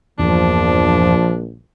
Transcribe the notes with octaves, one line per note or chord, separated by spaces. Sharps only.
A#1 E2 G2 A#2 F3 D4